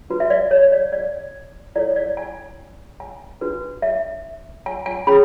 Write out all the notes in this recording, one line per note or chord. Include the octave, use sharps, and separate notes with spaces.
D4 F#4 B4
E5
D5
C#5
D5
D5
E4 A4 C#5 D5
D5
G#5
G#5
D4 F#4 B4
E5
G#5
G#5
C#4 G#4 C#5 B5